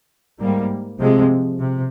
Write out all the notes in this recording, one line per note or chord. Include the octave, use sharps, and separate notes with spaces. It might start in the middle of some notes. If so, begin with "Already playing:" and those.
G#2 G3 A#3
C3 F3 G#3 C4
C3